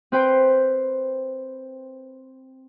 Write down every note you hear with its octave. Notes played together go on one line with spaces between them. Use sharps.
C4 B4 C5 G5